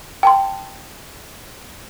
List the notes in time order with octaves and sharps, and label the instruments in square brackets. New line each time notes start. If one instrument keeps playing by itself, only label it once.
[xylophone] G5 A5 C6